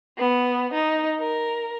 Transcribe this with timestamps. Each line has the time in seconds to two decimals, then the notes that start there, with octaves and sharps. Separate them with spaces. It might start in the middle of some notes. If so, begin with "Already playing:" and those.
0.18 B3
0.73 D#4
1.19 A#4